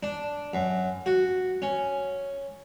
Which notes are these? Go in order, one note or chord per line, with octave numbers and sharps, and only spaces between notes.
D4
F#2
F#4
C#4